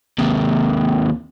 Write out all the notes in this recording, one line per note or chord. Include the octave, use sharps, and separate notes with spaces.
D#2 C3